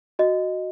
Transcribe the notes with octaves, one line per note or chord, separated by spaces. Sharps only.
F#4 D#5